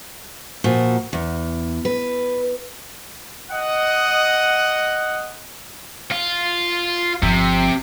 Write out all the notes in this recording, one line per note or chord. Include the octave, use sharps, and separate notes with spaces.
A#2 F3 F#4
E2
B4
D#5 F#5
F4
G1 C3 F3